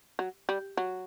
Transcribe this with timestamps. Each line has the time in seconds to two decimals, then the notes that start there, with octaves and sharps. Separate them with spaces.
0.19 F#3
0.49 G3
0.77 F#3